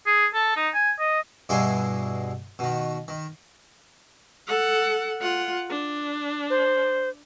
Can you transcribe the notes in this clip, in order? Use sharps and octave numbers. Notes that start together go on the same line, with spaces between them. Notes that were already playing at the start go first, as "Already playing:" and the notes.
G#4
A4
D#4
G#5
D#5
G2 B2 E4 G#4 F5 C6
B2 D#3
D#3
A4 F#5
F4 F#5
D4
C5